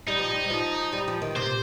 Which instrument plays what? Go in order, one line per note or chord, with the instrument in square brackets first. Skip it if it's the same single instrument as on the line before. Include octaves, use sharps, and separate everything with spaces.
[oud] G3 [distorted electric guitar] D#4
[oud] F3
G3
G3
F3
G3
F3
D#3
[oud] C3 [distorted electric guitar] C5
[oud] A#2